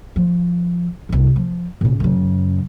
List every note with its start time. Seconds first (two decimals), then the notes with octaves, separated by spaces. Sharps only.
0.16 F3
1.09 G1 C2
1.36 F3
1.81 A#2 C#3
2.00 F#2 C#3